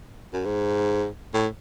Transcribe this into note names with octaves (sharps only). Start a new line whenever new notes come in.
F#2
G#2
A2